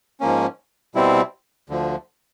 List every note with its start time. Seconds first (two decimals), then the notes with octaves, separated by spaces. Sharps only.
0.21 G#2 F3 A#3 C#4
0.95 B2 G3 C4 E4
1.70 D2 D3 F3